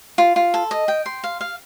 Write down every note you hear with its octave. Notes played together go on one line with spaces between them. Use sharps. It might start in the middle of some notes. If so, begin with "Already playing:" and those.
F4
F4
A4
D#5
G5
C6
F5
F5